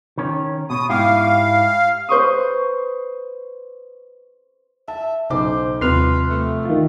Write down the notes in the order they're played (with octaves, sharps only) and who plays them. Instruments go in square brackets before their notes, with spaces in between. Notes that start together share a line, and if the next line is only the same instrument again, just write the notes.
[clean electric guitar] D#3 C#4
[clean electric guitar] B2 [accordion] D#6
[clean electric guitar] G#2 E4 G4 [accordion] F5
[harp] B4 C5 C#6 D#6
[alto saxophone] E5 [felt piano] A5
[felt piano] B1 D6 [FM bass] C#3 [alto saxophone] C5
[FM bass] D#2 [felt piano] C3 F3 G3 [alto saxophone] B4 [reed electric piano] C6 F6
[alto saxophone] A3
[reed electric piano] D#3 F4